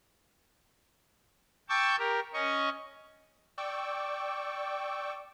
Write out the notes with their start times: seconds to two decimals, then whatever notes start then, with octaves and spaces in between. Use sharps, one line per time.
1.69 G5 A5 C#6 D6 E6 G6
1.98 G4 A#4
2.34 C#4 D#5 C#6
3.58 D5 G5 C#6 D6 E6